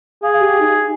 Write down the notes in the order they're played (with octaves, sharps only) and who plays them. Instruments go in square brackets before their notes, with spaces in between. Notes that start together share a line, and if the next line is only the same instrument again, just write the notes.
[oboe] G#4 [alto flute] F5
[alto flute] G4
D#4